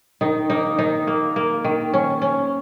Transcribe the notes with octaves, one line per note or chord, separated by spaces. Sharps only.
D#3 D#4
A#3 D#4
D#3 D#4
A#3
A#3
D#3
C#4
C#4